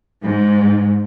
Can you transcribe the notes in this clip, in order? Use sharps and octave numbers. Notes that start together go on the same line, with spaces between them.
G#2